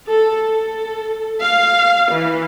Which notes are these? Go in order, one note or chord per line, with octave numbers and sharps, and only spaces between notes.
A4
A4
F5
E3